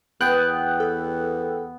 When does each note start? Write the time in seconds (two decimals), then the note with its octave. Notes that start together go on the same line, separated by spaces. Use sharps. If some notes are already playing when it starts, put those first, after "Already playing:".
0.21 E2 B3 G5 F#6
0.80 A4